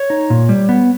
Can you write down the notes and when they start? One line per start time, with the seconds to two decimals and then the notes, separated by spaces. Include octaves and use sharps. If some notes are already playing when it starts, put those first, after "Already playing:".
Already playing: C#5
0.10 D#4
0.30 A#2
0.49 G3
0.69 B3